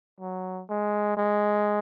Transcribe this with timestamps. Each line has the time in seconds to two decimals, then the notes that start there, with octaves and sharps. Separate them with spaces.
0.20 F#3
0.69 G#3
1.17 G#3